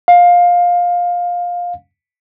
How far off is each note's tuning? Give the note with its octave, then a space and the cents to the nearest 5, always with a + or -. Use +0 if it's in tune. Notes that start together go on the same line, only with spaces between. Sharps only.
F5 +15